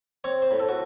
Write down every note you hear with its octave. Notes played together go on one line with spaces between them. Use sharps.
C4 C#5
C5
A2
A4
F#4